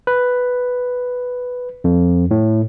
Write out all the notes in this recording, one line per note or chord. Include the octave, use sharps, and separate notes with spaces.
B4
F2
A2